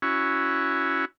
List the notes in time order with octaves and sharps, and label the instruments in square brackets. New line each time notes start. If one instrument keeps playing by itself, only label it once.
[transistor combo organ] C#4 E4 F#4